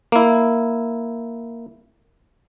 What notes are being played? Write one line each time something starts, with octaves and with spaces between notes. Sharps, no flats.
A#3 E4